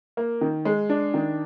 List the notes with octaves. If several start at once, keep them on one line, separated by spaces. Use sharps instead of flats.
A#3
D#3
G#3
D4
D#3